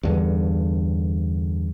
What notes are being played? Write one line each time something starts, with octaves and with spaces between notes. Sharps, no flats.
E2 G2 D3